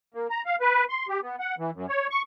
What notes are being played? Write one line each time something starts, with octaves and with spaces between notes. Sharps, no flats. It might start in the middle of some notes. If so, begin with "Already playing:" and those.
A#3
A#5
F5
B4
C6
G4
B3
F#5
E3
F#2
C#5
C#6